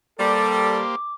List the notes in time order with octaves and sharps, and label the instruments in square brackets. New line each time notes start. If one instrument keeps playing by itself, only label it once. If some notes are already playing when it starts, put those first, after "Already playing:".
[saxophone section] G3 [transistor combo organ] A#3 G4 C5 [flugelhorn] A4 [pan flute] D6